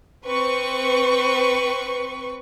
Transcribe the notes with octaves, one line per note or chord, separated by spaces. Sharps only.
C4 B4 C#6